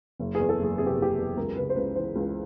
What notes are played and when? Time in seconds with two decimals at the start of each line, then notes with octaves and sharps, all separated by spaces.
0.19 F#1
0.35 E2 G#4
0.49 A4
0.59 F#1 G#4
0.78 C3 G#4
0.86 G4
0.98 F#1 G4
1.17 E2
1.37 C#2 A#4
1.56 C#3 B4
1.70 C5
1.76 C#2 B4
1.95 E3 C5
2.15 C#2